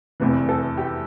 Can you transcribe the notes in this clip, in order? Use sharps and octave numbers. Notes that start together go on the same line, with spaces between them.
F1 E2 C3 E3
A4
G4